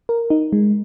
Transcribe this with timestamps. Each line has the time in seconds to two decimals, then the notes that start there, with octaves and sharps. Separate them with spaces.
0.09 A#4
0.30 D#4
0.53 G#3